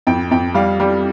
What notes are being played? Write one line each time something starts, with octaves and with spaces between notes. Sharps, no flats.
F2 G5
F2 G5
G3 F5
G3